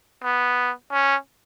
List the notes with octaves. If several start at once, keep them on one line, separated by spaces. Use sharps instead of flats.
B3
C#4